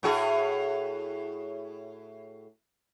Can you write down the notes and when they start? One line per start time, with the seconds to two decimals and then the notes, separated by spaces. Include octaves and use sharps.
0.03 A2 F#4 G#4